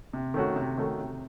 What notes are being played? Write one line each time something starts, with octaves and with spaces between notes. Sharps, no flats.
C3
D#3 A3 C#4 F#4
C3
D#3 A3 C#4 F#4
C3